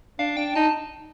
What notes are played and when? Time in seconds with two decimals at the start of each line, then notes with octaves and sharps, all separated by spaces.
0.19 D4 F5
0.37 D4 G5
0.55 D#4 A5